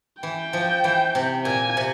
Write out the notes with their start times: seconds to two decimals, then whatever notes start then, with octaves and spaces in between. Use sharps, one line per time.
0.23 E3 G5
0.53 F3
0.84 E3
1.15 C3
1.45 A#2 G#5
1.77 C3